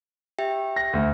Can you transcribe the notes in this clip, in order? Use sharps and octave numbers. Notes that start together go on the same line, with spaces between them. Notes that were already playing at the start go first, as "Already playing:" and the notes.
G4 E5 G5
A#6
D2